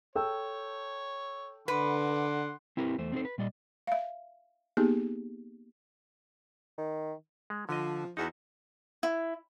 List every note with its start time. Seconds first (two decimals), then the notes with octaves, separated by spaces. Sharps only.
0.15 A4 C#5 G5 E6
1.68 D3 B4 F#5 C6 D6
2.77 C4 E4 G4 A#4 B4
2.98 E2 A3 C5
3.12 C4 D4 D#4 F#4 A4 C5
3.25 B4
3.38 A#2 G3 D5 D#5
3.87 E5 F5
4.77 A#3 B3 D#4 G4 G#4
6.78 D#3
7.50 G#3
7.69 D3 F3 D#5
8.17 E2 D#4 F#4 E5
9.03 E4